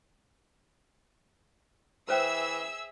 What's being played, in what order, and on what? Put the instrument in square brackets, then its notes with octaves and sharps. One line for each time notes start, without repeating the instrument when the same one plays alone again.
[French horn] E3 [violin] G#4 E5 [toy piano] B4 C5 G5 [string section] E6